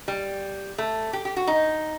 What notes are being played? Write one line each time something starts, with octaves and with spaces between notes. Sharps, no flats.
G3
A3
G4
G4
F#4
D#4